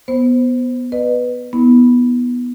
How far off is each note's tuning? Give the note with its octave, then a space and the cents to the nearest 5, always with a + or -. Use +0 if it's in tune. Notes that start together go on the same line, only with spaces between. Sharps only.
B3 +0 C5 +0
B4 +0 D#5 -35
B3 -10 E4 -40